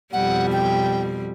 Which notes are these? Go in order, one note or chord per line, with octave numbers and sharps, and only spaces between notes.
F2 B2 G3 F#5
G5